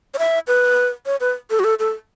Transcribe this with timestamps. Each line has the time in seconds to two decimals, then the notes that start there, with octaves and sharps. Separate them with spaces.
0.14 C#5
0.19 E5
0.47 B4
1.06 C#5
1.20 B4
1.50 A4
1.59 F#4
1.64 A4
1.79 A4